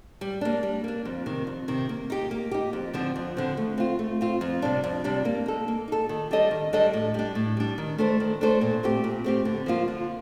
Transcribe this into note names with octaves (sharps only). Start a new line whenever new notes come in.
G3
A#3 D4
G3
A#3 D4
F2
C3 D#3
F2
C3 D#3
A#3
D#4 G4
A#3
D#4 G4
F2
D3 F3 C4
F2
D3 F3 C4
A3
C4 F4
A3
C4 F4
F2
C3 G3 D4
F2
C3 G3 D4
A#3
D#4 A4
A#3
D#4 A4
D#3
G3 D4 A4 D#5
D#3
G3 D4 A4 D#5
A2
G3 D4
A2
G3 D4
D#3
A3 D4 A4 C5
D#3
A3 D4 A4 C5
A#2
A3 C4 G4
A#2
A3 C4 G4
D3
F3 A#3 F4
D3